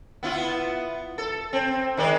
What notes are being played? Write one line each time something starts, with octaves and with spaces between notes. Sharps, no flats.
B3 E4 F4
A4
C4
D#3 G#3 D5